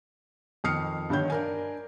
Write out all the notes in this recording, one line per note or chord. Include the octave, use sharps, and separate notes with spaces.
F2 D#3 D#6 F6 C7 C#7
G2 D3 D#3 C#5 G6
D4 A#4 G#5